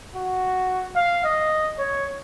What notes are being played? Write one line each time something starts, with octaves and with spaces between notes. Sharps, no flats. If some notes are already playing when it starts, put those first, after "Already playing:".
F#4
F5
D#5
C#5